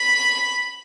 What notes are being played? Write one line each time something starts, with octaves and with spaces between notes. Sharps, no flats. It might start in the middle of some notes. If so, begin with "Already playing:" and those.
Already playing: B5